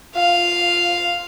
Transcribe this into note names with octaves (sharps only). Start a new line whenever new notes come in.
F4 F5